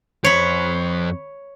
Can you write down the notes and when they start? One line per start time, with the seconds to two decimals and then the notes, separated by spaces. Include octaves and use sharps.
0.24 F2 C5 C#5 B5